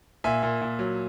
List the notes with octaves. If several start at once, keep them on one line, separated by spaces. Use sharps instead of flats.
A#2 E5 G#5
A#2
A#2
F#3